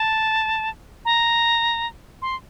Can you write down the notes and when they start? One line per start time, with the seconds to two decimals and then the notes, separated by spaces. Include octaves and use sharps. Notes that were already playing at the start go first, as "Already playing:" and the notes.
Already playing: A5
1.05 A#5
2.22 C6